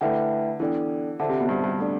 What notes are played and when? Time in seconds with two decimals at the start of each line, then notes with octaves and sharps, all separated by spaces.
0.01 D3 A3 E4 B4 E5 G5
0.60 E3 B3 D4 A4 D5 G5
1.19 D3 F4 C5 E5 A5
1.29 C3
1.40 B2
1.49 G2
1.64 G2
1.79 A3 D4 A4 D5